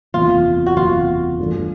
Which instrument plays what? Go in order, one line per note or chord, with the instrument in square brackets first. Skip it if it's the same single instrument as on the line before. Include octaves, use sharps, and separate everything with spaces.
[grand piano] F#1 E2 C3 E3 [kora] F4
[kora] F#4
[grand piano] F#1 E2 C3 E3 [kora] F4
[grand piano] G2 E3 A3 D4